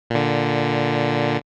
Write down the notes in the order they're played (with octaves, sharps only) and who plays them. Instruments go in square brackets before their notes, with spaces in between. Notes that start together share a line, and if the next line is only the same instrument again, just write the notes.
[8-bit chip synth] A#2 D3